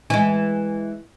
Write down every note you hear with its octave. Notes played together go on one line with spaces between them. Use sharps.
E3 G#3